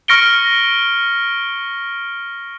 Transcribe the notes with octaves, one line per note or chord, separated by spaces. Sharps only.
C#6 F6 A#6 C#7 D7 G7